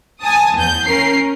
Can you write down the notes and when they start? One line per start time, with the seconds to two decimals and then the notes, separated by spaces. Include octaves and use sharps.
0.21 G#5 A5 D#6
0.56 E2 G6
0.85 C#4 A#4 C7